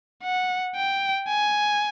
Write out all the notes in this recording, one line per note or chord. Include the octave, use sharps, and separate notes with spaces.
F#5
G5
G#5